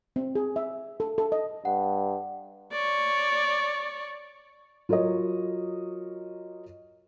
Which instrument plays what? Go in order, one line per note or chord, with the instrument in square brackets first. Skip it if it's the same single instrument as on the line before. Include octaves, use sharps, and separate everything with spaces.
[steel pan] C4
G#4
E5
A4
A4
D#5
[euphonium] G2 [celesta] F#5
[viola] C#5 D5
[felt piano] F#3 F4 A#4 C#5 D#5